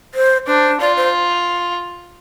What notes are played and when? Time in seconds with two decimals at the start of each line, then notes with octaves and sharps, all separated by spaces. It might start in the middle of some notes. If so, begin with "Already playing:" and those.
0.15 C5
0.47 D4 C5
0.81 F4 D5
0.97 C5